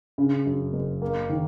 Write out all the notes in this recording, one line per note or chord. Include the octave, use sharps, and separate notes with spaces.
C#3
F#2
F#1
A#3
D#3